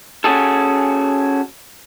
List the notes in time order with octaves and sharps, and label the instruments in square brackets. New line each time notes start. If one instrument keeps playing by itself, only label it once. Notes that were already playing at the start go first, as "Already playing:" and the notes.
[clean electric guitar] C#4 F#4 G#4 A4